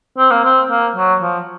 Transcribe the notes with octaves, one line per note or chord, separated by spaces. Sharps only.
C4
A#3
C4
A#3
F#3
F3